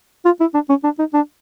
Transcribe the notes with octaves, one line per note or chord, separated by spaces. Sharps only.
F4
E4
D4
C#4
D4
D#4
D4